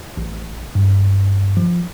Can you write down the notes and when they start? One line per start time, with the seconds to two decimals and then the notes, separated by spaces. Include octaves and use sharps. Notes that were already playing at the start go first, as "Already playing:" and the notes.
0.17 A1
0.75 G2
1.57 F3